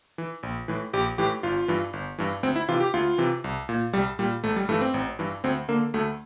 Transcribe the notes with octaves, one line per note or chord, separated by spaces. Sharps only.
E3
A#1
A2 E3
A#1 G4
A2 E3 G4
G1 F4
G2 E3
G1
G2 E3
D2 C4
E4
C3 E3 F4
G4
D2 F4
C3 E3
C2
A#2
C2 G3
A#2 G3
A1 A3
G3
G2 E3 A3
C4
A1
G2 E3
D2 C4
D3 A#3
D2 A3